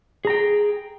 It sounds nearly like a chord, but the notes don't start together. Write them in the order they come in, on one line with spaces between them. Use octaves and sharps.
G#4 A#5 G5